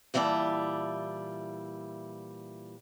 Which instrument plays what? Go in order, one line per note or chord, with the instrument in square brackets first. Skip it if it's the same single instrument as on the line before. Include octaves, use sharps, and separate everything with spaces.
[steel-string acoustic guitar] A#2 E3 G3 E5 A5